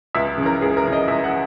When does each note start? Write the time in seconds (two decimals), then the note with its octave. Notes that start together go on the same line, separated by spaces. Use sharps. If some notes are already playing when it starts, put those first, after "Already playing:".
0.15 C#2 E5
0.37 C#3
0.42 E3 A#4
0.61 C#2 G#4
0.77 A#4
0.84 C#3 E3
0.93 D#5
1.08 C#2 E5
1.24 F#5